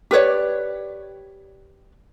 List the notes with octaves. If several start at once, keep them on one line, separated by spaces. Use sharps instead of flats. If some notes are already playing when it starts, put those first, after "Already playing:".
G4 B4 C#5 D5